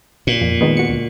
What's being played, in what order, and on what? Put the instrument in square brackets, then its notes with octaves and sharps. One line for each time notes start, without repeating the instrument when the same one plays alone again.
[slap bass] A#2
[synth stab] F2
D#3 G#3 B3
F#4 C#7
D2